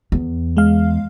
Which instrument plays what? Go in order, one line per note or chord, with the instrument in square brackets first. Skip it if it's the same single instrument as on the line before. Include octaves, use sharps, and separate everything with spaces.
[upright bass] E2
[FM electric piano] G#3 F5